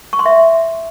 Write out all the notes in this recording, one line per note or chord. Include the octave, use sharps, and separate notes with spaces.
C#6
C6
E5